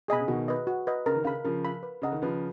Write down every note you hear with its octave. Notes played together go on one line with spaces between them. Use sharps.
B2 G#4 D#5 G#5 B5
C#3
B2 D#3 F#4
B4 D#5
F#4
B4 D#5
C#3 A#4
D#3
C#3 F5 B5
C#3 F3 A#4
F5 B5
B4
C#3 D#5 F#5 A#5
D#3
C#3 F3 B4